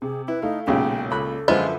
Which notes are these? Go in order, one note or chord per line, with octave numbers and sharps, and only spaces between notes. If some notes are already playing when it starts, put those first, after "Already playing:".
C3 G#4
E4 B4
A3 D#4 F5
B1 A#2 C#3 G#3 C#4 G4 G5
C#2 A4 B5 F#6
F#2 D3 F3 G#3 F4 B4 C5 E5